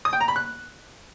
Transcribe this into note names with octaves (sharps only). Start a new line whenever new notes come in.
D#6
G5
A#5
B5
F#6